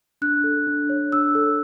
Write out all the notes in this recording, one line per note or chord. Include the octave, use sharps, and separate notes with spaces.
D4 F#6
A4
D4
C#5
D4 E6
A4